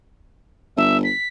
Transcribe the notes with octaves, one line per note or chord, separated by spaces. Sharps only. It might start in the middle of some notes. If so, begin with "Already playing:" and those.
G1 E5
B6